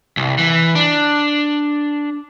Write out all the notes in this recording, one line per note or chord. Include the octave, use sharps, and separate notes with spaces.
C2
E3
D4